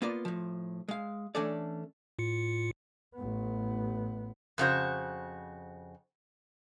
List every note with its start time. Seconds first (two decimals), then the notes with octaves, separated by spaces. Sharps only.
0.02 A#3 B3 F4 B4 D5
0.25 A2 F3
0.88 G#3 F5
1.35 E3 A3 C#4 D4 A4 D5
2.19 A2 F4 C#7
3.15 A1 B3
4.58 F2 C#3 F#4 C5